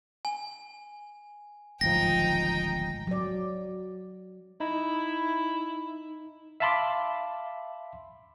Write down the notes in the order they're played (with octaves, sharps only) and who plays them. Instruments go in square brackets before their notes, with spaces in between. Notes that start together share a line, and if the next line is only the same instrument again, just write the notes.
[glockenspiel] G#5
[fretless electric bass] D1 G#1 F3 [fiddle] D#4 G5 [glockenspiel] A#6
[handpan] F#3 D5
[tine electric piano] D#4 [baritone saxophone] E4
[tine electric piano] E5 F5 A5 B5 C6 D6